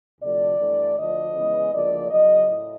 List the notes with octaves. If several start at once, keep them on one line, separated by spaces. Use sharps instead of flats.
D2 C3 F3 A3 D5
G2 E3 A3
D2 D3 F3 D#5
C#3 E3 G#3 B3
D2 C#3 F3 A#3 D5
E2 C#3 F#3 D#5
A2